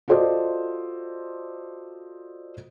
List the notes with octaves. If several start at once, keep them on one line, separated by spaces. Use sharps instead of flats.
F4 F#4 A4 C5 D5 D#5